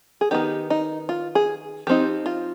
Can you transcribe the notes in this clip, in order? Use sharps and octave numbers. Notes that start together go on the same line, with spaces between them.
G#4
D#3 B3 D#4 G4
D#4
F4
G#4
F3 C4 D#4 G4
F4